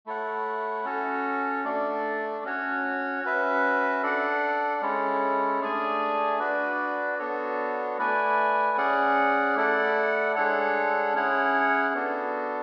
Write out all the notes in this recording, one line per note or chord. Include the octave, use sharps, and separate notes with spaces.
A3 E4 A4 C#5 F#5
C#4 F#4 A4 C#5
A3 D4 A4 D5
C#4 F#4 C#5
C#4 F#4 B4 E5
D4 A4 D5 F#5
G#3 C#4 E4 A4 C#5
A3 D4 G#4 D5 G#5
D4 F#4 B4 D5
B3 D4 F#4 A4 C#5
A3 E4 B4 D5 G#5
C#4 G#4 D5 F#5
A3 E4 A4 D5 F#5
G#3 D4 A4 C#5 F#5
C#4 E4 G#4 C#5 F#5
B3 D4 F#4 A4